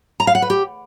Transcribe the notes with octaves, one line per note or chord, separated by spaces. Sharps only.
A#5
F5
F#5
B4
G4